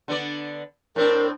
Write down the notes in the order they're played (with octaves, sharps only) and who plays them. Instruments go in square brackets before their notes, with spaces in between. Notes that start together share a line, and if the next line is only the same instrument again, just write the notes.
[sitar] D3 B3 D5
[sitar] A2 C4 D4 [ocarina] A#4